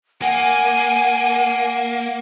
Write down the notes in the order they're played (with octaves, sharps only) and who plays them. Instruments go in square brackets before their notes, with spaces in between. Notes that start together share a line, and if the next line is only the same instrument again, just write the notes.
[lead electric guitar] A#3 [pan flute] F#5 [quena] G#5